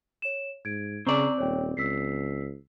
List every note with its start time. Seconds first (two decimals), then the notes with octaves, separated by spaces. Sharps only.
0.22 C#5 E7
0.65 G#2 G#6 D7
1.07 C#3 C4 D5 A#5 C#6
1.38 D#1 C#5 G5
1.77 C#2 E6 B6 C7